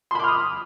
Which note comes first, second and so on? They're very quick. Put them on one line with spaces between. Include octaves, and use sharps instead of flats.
C6 B5 D6 F6 D#6